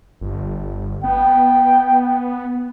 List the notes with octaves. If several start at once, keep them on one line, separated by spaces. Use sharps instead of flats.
G1
B3 G5